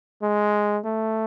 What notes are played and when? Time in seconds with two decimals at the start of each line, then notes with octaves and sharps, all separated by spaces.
0.22 G#3
0.84 A3